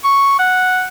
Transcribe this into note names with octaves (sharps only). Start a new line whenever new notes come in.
C#6
F#5